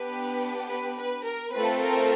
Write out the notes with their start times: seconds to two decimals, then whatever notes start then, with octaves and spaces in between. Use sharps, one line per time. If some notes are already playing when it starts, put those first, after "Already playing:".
Already playing: B3 D4 G4 B4
0.68 B4
0.97 B4
1.25 A#4
1.53 A3 C4 F4 A4 B4
1.81 A#4